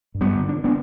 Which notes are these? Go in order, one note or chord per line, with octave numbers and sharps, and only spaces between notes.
G2
G3 B3
D3
D4
G2
B3 D4